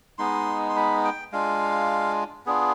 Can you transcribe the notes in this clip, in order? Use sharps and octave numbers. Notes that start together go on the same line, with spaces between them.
G#3 B3 D#4 C6
C6
B5
G5
G#3 D4 F4 F5
B3 D4 F4 G#4